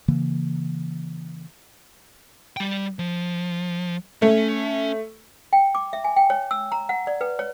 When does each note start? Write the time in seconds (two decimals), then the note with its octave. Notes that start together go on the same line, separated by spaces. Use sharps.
0.08 C#3 E3 A#3
2.57 G3 G5
2.99 F3
4.22 A3 C#4
5.53 G5
5.75 D6
5.93 E5
6.04 G#5
6.16 G5
6.30 C#5
6.51 E6
6.72 A#5
6.89 F#5
7.07 D5
7.21 B4
7.39 C#5